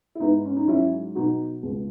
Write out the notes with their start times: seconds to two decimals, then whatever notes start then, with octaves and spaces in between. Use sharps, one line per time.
0.15 E4
0.20 G#2 B3 D#4
0.45 C#4
0.57 D#4
0.68 F#3 C#4 E4
1.15 B2 D#4 F#4
1.63 C#2